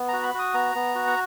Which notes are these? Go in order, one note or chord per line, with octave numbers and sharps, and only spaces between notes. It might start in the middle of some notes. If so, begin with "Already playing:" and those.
Already playing: B3
F#4 A#5
B5
F#4 D#6
B3 A#5
B3
F#4
F#5